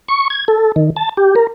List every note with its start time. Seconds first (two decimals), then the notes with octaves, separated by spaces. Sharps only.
0.09 C#6
0.30 G#6
0.48 A4
0.76 D#3
0.97 A5
1.17 G4
1.36 A#4